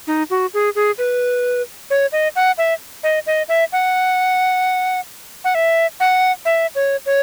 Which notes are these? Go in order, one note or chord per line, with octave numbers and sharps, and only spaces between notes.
D#4
F#4
G#4
G#4
B4
C#5
D#5
F#5
E5
D#5
D#5
E5
F#5
F#5
E5
F#5
E5
C#5
C#5